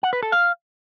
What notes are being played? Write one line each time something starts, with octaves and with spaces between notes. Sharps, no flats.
F#5
B4
A4
F5